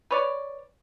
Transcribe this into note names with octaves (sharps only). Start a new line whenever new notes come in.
B4 C#5 D5